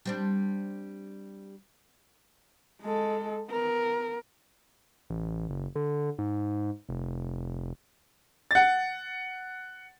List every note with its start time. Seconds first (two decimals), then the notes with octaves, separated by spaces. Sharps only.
0.05 G3 C4 D4
2.82 G#3 A4
3.49 B3 A#4
5.10 A1
5.49 F#1
5.76 D3
6.19 G#2
6.89 F1
8.51 F#5 A6